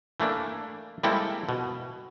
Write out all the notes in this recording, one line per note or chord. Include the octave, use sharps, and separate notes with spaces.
E3 A3 A#3 D4
G3 G#3 A#3 C4 E4 A4
B2